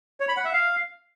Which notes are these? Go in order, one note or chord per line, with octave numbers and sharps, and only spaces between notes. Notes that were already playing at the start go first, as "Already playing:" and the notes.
C#5
B5
F#5
E5
F5